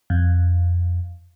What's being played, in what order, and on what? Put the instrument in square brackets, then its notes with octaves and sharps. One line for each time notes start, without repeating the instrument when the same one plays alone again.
[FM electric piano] F2